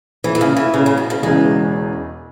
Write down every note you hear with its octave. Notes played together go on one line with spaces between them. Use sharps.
E3
E3
C#3
E3
C#3
C#3
B2
C#3
E1 E2 C#3 E3 G#3